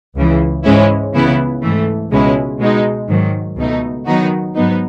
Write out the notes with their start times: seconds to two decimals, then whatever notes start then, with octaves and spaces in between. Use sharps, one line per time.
0.16 C#2 C#3 E3
0.64 G#2 E3 G#3 C#4 E4
1.14 C#2 C#3 E3 B3 E4
1.63 G#2 E3 A3
2.11 C#2 B2 G#3 C#4 E4
2.60 B2 G#3 D#4
3.08 G#2 D#3 F#3
3.57 C#2 B2 A3 D#4
4.06 D#3 F#3 B3 D#4 F#4
4.55 G#2 F#3 B3 D#4